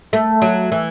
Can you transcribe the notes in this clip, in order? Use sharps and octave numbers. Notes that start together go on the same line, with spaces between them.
A3
F#3
E3